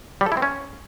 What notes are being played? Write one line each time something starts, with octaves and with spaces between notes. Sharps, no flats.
G3
A4
E4
C4
C#4